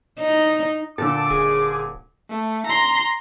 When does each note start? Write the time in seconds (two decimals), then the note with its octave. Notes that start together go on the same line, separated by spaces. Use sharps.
0.20 D#4
0.98 A#2 D3 A4 D6
1.30 D#1 G#4
2.29 A3
2.66 A#5 C6